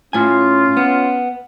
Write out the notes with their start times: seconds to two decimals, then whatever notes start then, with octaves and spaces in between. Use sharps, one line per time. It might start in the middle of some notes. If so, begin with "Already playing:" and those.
0.13 A2 C#4 F4 G#5
0.77 B3